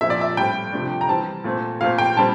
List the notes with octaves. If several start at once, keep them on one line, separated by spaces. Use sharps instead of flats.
A#2 F3 C4 E5
D5
E5
A2 G3 C4 G5
C3 F3 A3 D4
A#5
E3 G3 C4 A5
A#2 A3 C4
A#2 A3 C4 F5
G5
A#2 G3 C4 A5